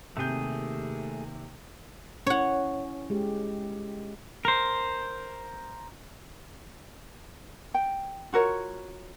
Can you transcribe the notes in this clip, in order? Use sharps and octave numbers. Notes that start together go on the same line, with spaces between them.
D#2 C3 A3 G#4 G6
C#4 E4 C#5 F#5
G#3 G4
A#4 C5
G5
F4 F#4 A#4 C#5